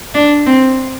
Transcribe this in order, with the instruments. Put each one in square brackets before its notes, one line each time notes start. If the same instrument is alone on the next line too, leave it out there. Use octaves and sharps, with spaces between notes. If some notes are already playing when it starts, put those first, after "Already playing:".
[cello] D4
C4